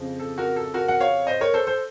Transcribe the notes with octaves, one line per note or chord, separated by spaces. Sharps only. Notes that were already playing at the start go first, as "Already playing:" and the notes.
Already playing: F2 C#3 F3
A4
F#4 A#4
A4
F#4 A#4
F#5
C#5 F5
C5 D#5
A#4 C#5
A4 C5
A4 C5